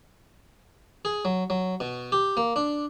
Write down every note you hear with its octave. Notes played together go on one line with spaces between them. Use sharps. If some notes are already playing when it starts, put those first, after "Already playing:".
G#4
F#3
F#3
B2
G4
A#3
D4